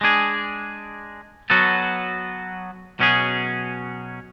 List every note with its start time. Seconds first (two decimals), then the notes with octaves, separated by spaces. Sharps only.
0.01 G#3 D4 G#4
1.50 F#3 B3 F#4 A4
3.00 B2 F#3 C#4 G#4